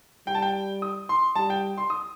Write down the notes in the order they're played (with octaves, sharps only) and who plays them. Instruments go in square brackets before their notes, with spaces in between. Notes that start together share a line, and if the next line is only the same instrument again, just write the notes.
[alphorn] G3 [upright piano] G5
[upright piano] A5
G5
D#6
C6
[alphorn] G3 [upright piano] A5
[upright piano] G5
C6
D#6